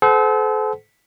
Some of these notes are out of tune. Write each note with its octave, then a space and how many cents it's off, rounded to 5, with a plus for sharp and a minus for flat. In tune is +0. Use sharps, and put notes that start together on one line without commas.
A4 -40 C5 -35 F#5 +20